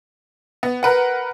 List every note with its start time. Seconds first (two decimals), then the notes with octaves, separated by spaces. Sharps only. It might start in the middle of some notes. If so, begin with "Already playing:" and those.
0.63 B3
0.83 A#4 B4 F#5